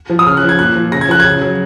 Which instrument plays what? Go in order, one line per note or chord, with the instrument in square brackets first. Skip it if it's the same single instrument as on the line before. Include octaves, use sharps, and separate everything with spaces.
[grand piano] F3
D#6
C#3 F6
F#6
F3
G#6
A#2 F#6
F3
C#3 A#6
G#6
F3 F#6
C#3 G#6
F#3